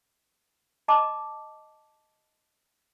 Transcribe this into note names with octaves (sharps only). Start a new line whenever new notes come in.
D#5 A5 A#5 D6